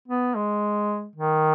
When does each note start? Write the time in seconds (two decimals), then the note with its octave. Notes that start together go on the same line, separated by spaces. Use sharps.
0.08 B3
0.35 G#3
1.16 D#3